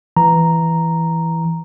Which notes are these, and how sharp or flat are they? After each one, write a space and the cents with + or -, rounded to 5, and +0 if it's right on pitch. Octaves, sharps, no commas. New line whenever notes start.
E3 +0 A#5 +0